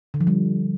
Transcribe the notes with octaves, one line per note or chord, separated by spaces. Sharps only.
D3
F3
G3